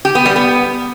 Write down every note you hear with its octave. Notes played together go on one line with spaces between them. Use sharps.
G4
B3
G3
B3